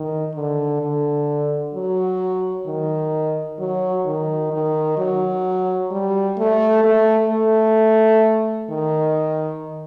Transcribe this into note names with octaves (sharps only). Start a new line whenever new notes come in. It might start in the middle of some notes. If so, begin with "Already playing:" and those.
Already playing: D#3
D3
D3
F#3
D#3
F#3
D#3
D#3
F#3
G3
A3
A3
A3
D#3